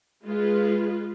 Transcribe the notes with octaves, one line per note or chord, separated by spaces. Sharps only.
G#3 F4 B4